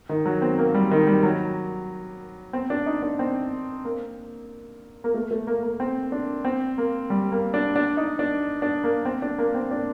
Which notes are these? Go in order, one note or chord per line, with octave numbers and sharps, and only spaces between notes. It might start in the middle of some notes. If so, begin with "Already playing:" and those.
D#3
F#3
C4
A#3
G3
D#3
G3
F#3
C4
D4
D#4
D4
C4
A#3
A#3
A3
A3
A#3
A#3
C4
D4
C4
A#3
G3
A#3
D4
D4
D#4
D4
D4
A#3
C4
D4
A#3
C4
D4